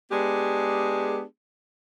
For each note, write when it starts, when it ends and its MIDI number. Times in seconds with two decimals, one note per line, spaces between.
0.12 1.23 56
0.12 1.23 59
0.12 1.23 62
0.12 1.23 67
0.12 1.23 68